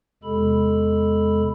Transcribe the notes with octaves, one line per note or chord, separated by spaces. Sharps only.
E2 C3 G#3 A4 B5